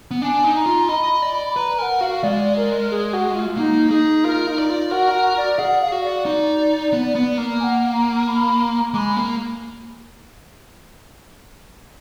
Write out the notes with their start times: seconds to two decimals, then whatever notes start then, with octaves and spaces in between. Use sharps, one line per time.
0.11 B3
0.22 D4 G#5
0.44 D#4
0.56 A#5
0.66 F4
0.89 D#5 B5
1.22 D5
1.56 B4 A#5
1.78 A#4 G#5
1.82 F#5
2.01 F#4 F5
2.23 G#3 D5
2.56 A#4
2.91 G#4
3.13 F#4
3.35 F4
3.57 A#3 D#4
3.91 D#4 G#4
4.24 F4 A#4
4.47 D#4
4.58 D5
4.69 F4
4.91 F#4 A#4
5.13 F#4
5.37 D5
5.58 G#4 F#5
5.81 F5
5.92 F#4
6.04 D5
6.26 D#4
6.93 B3
7.15 B3
7.38 A#3
7.60 G#5
7.64 F#5
7.93 A#5
8.27 B5
8.60 A#5
8.94 G#3 D6
8.98 B5
9.16 A#3